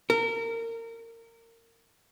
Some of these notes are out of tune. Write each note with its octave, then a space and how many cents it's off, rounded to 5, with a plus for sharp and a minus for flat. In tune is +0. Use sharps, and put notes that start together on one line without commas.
A#4 -25